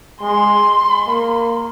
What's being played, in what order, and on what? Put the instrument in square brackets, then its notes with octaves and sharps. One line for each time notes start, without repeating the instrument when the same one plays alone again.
[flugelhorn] G#3 [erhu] C6
[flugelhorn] A#3